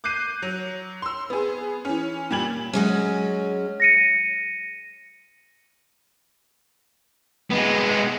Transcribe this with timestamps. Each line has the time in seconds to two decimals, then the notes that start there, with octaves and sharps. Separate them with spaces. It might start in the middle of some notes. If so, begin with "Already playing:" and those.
0.04 D6 F#6 G6 C7 D#7
0.42 F#3
1.02 C6 E6
1.30 B3 G#4
1.85 E3 C#4
2.31 A#2 G3 G#6 F#7
2.73 F#3 G#3 C#4
3.80 A#6 C#7 D#7
7.50 G#3 B3